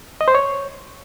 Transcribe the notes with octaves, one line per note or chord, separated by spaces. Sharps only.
D#5
C5
C#5